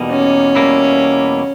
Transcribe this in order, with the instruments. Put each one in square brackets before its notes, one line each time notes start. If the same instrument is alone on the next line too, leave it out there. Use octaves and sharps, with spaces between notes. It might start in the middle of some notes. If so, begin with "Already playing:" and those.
Already playing: [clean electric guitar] E2 B2 G3 A#3 D#4
[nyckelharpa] C#4
[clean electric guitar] E2 B2 G3 A#3 E4